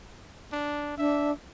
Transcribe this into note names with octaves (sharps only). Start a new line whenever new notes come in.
D4
D4 E5